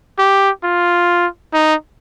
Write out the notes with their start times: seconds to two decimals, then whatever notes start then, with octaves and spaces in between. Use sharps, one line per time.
0.19 G4
0.64 F4
1.53 D#4